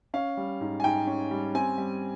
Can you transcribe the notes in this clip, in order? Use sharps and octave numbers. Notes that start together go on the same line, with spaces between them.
C#4 F5
G3
G#2
G#5
G#2 G5
C#4
G3
C4 G#5
G3